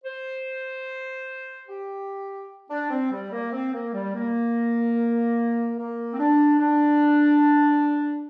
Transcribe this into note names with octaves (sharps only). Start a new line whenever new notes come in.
C5
G4
D4
C4
G3
A#3
C4
A#3
G3
A#3
A#3
C4
D4
D4